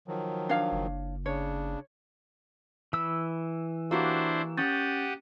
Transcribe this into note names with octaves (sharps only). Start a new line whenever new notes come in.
D#3 F3 F#3
D4 C#5 F5
F#1
C#3 D4 C#5
E3 B5 E6
A#3 D4 E4 F#4 G4 C5
C#4 G4 F#5 C#6 D#6 G6 A6